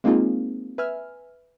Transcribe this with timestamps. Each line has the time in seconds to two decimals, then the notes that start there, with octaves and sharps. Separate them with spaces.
0.04 G#3 A#3 C4 D#4 F4 G#4
0.78 B4 E5 G#5 F6